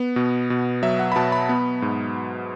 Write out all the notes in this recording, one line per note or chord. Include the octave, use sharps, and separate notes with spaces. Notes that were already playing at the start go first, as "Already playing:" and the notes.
Already playing: B3
B2
B2
F#3 E5
F#5
B5
B2 A5
B5
B3
G#2